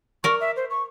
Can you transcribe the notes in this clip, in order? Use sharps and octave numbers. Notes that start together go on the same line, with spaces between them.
A#4 D5 C#6
E5
C5
C#6